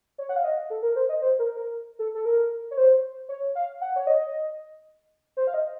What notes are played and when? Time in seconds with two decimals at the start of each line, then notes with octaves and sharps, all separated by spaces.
0.18 C#5
0.29 F#5
0.36 F5
0.44 D#5
0.70 A4
0.82 A#4
0.96 C5
1.09 D#5
1.22 C5
1.39 A#4
1.57 A#4
1.99 A4
2.15 A4
2.25 A#4
2.71 C#5
2.77 C5
3.29 C#5
3.55 F5
3.81 F#5
3.96 C#5
4.07 D#5
5.37 C5
5.47 F5
5.54 D#5